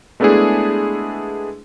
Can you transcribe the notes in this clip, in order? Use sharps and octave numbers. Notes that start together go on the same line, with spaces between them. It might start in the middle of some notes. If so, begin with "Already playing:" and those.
G#3 A3 B3 D4 E4 G#4